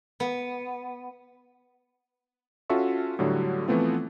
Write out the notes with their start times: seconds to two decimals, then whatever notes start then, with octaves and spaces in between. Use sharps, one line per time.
0.20 B3
2.70 C#4 F4 F#4 A4 E5 C#6
3.19 A2 D3 F#3 G3
3.68 E3 F3 A3 B3 C4 F4